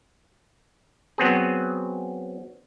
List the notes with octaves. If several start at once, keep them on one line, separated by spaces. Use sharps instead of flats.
F#3 B3 C4 G#4